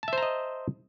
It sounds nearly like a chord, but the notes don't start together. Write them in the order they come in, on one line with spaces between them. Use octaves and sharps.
A5 E5 C5 A#5 D#5